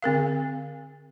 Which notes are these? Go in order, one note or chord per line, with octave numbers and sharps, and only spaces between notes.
D3 C4 A#4 F5